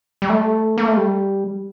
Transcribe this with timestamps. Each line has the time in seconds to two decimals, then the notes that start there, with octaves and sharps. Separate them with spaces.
0.22 G3
0.29 A3
0.78 A#3
0.88 A3
0.97 G3